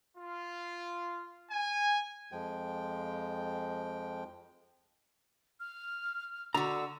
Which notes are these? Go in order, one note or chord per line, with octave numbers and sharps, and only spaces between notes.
F4
G#5
F2 F3 G#3 G5
F6
D3 F#4 A#5 E6